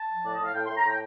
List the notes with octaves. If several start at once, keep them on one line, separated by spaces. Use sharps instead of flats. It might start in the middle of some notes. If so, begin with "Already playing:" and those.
Already playing: A5
F3
A2 D5
A2 D#5
F5
A2 G5
A2 C6
A#5
A2 G5